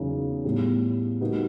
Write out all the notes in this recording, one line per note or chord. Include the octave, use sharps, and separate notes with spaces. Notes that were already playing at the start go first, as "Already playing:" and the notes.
Already playing: E2 C#3 F#3 A#3 D#4
A2 E3 G3 B3
G3 A#3 D#4 F#4 B4